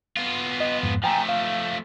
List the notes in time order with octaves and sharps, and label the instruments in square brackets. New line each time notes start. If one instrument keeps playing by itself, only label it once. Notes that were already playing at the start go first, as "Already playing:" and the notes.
[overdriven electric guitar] B3 F4
[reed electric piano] D#5
F2 G#2
[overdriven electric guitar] F3 A3 [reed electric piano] G5 G#5 A#5
[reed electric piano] F5